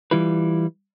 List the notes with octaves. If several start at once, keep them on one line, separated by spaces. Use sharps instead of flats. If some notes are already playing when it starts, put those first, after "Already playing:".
E3 G3 E4 F4 B4